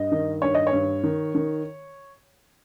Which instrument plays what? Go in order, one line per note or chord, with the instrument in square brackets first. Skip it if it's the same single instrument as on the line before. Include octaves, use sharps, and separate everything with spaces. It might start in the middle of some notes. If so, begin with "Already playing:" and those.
Already playing: [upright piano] G2 D#5
D#3
G2 C#5
D#5
C#5
G2
D#3
D#3